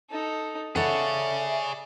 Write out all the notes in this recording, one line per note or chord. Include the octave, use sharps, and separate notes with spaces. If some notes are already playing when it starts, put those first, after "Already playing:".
D#4 A4
G#4 A4 C#5 D5 E5 F#5